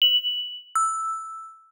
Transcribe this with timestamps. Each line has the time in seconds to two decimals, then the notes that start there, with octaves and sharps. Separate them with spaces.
0.02 F#7
0.75 E6